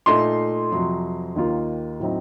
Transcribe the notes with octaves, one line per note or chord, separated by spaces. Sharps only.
A#2 A3 D#4 C6
F2 C3 F#3
D#2 D#3 A#3 F4
A2 F#3 C4 D#4